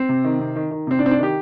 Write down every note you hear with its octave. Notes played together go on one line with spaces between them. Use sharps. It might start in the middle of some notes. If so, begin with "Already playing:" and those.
Already playing: C4
C3
D#3
C3
D#3
D#3
C3 C4
D4
C3 C4
D4
D#3 G4